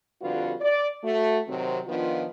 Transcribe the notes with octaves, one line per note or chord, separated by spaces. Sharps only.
F2 D3 G3 F4 F#4 B4
D5
A3 F#4
C3 D#3 F#3 C4
D#3 F3 B3 D4 F4